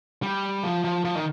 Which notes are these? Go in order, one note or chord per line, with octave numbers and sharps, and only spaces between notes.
G3
F3
F3
F3
D#3